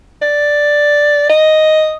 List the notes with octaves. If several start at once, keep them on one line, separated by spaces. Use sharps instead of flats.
D5
D#5